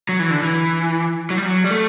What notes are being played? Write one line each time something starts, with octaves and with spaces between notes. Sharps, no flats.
F#3
E3
D3
E3
F#3
G3
F#3
G3
A3